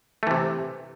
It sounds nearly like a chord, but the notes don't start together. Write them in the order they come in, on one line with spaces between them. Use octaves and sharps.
A3 E3 C3